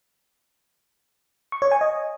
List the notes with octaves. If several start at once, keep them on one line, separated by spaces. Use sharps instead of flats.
C#6
C#5
G#5
D#5